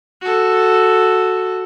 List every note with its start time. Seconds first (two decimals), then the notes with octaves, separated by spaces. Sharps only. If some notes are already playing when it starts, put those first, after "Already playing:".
0.21 F#4 A4